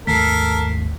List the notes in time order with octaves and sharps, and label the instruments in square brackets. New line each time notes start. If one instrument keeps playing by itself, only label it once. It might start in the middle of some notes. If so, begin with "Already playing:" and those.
[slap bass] G#1 D#2 A3 [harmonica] A4 A#4 [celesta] B6 C7